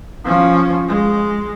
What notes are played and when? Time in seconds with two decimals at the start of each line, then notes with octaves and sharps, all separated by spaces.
0.25 F3 C#4
0.88 G#3